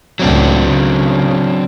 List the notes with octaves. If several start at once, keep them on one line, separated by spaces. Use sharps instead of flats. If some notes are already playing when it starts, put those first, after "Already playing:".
C#2 A2 F#3 C4 D4
C#3